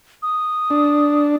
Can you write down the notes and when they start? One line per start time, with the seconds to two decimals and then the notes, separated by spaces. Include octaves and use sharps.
0.23 D#6
0.70 D4